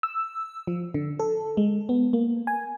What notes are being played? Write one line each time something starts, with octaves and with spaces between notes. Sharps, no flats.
E6
F3
D3
A4
G#3
B3
A#3
G#5